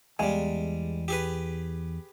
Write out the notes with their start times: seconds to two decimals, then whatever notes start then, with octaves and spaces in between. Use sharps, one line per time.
0.19 E2 G3 G#3 F5 G#5
1.08 G4 G#4 B4